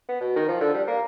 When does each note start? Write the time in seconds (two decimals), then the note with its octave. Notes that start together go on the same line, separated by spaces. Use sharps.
0.09 B3
0.21 B2
0.36 D#3
0.48 F3
0.61 D3
0.74 G3
0.88 A#3